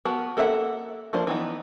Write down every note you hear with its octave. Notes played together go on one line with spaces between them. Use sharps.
B3 F#4 A#4 A5
A#3 A4 A#4 E5 F#5
F3 A#3 D4 F4 C5
E3 B3 D#4